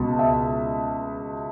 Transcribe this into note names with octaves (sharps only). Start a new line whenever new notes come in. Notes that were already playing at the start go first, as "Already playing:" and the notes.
Already playing: C#2 B2 A5
E5